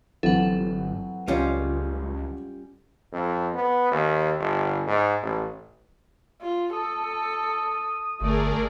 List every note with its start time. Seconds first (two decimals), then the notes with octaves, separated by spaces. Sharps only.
0.23 G1 E3 F#3 C4 A4 F#5
1.28 C#2 G3 C#4 F4
3.12 F2
3.54 B3
3.92 D#2
4.40 G1
4.87 G#2
5.23 A1
6.41 F4
6.73 A4 D#6
8.21 G1 A3 G#4 A#4 D5